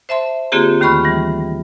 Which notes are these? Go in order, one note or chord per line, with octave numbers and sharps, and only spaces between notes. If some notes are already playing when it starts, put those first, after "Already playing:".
C5 E5 A5 C6
D3 A#3 C4 F4 G4 G#4
D#2 D#3 A3 B5 C#6 F6
E3 G3